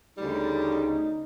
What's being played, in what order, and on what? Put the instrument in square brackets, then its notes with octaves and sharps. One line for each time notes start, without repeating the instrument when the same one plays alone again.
[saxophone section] D2 C#3 G3 [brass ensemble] D#4